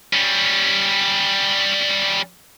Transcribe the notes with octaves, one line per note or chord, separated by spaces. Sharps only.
G3 C#4